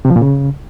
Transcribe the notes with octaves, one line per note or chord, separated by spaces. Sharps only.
C3
F3
A#2
C#3